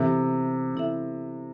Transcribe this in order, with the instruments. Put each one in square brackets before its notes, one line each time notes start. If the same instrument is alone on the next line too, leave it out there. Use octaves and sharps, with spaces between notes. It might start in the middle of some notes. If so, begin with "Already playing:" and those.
Already playing: [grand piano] C3 [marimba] E3 B3 E4 A4 E5
[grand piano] C3 [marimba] E3 B3 E4 A4 E5